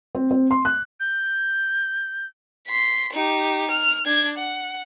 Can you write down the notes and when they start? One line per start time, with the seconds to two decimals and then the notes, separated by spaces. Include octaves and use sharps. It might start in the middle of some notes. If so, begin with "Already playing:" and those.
0.15 C4
0.31 C4
0.51 C6
0.65 F#6
1.00 G6
2.67 C6 B6
3.14 D#4 G4
3.71 F6
4.06 D4 G#6
4.38 F#5